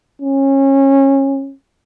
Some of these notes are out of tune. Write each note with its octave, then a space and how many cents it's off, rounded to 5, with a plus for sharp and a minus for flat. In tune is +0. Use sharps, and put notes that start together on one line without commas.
C#4 -25